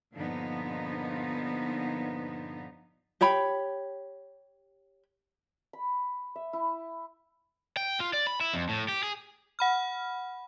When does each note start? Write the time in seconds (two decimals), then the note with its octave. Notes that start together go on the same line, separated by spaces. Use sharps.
0.14 G2 A#2 D3 F3 B3 D#4
3.21 G4 C#5 G5 B5
5.73 B5
6.35 E5
6.53 E4
7.77 G5
8.00 F4
8.13 D5
8.27 B5
8.41 E4
8.53 F2
8.69 A2
8.88 G4
9.03 G#4
9.59 F#5 B5 F6